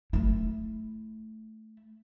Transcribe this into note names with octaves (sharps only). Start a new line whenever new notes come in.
A3 E4